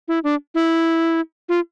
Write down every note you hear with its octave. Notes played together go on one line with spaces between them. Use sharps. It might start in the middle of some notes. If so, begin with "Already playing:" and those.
E4
D4
E4
F4